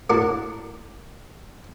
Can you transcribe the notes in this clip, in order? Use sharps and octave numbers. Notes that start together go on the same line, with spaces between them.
A2 D4 F#4 A#4 D5 A5